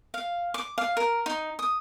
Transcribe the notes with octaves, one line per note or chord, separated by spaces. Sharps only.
F5
D6
F5
A#4
D#4
D#6